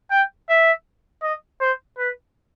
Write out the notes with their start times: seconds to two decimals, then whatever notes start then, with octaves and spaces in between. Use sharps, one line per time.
0.11 G5
0.49 E5
1.23 D#5
1.61 C5
1.98 B4